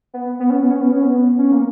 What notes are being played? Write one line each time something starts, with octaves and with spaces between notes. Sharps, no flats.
B3
B3
C#4
B3
C#4
B3
C#4
B3
C#4
A#3